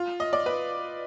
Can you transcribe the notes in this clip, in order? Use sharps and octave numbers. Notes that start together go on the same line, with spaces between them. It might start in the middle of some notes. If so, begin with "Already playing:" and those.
Already playing: F4
D#5
D5
B4